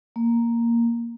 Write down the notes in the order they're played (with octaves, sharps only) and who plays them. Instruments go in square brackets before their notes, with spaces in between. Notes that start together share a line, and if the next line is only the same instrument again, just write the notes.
[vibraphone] A#3